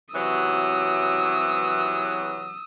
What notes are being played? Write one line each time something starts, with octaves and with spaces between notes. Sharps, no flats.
C3 E3 F#3 D#6 E6